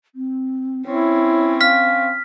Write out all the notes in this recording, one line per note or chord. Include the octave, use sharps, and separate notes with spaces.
C4
C4 C#4 E4 C#5
F5 F6 B6